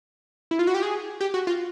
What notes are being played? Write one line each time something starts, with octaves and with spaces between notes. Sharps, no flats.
E4
F4
F#4
G4
G#4
G4
F#4
F4